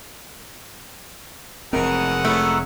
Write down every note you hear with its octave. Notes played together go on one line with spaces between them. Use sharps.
F1 B2 E3 G#3 C4 A#4 C#5 F#5
F#3 A3 B3 E4